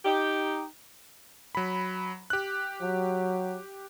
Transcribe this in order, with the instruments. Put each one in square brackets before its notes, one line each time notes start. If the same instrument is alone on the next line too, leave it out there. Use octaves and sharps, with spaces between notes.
[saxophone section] D#4 G4
[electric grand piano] F#3 B5
G4 F#6
[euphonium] F#3